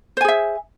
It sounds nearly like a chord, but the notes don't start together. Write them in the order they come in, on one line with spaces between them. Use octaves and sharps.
C5 G#5 G#4 E5